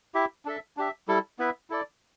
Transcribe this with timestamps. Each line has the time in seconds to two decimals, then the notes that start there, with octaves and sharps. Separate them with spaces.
0.14 E4 G4 E5
0.45 D4 A4 E5
0.77 D4 G4 E5
1.08 G3 E4 A4
1.39 B3 E4 B4 E5
1.70 E4 A4 D5